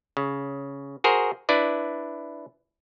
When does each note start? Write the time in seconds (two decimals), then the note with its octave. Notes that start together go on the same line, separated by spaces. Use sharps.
0.17 C#3
1.04 F#4 G#4 A#4 C5
1.49 D4 E4 B4 D5